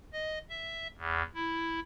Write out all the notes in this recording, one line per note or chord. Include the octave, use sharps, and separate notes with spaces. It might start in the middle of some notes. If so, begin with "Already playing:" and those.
D#5
E5
E2
E4